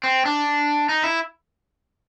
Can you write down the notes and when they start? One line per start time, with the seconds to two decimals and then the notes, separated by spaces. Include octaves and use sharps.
0.03 C4
0.25 D4
0.89 D#4
1.04 E4